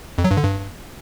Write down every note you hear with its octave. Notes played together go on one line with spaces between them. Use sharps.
F2
F#3
G2
D3
G2